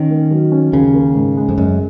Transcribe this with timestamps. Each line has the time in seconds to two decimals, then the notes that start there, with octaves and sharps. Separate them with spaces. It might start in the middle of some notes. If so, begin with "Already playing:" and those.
Already playing: D#3 C#4
0.10 A#3
0.31 F#3
0.52 C#4
0.73 D#2 C#3
0.94 A#3
1.15 G#2
1.37 G#3
1.49 F2
1.58 F#2 G#3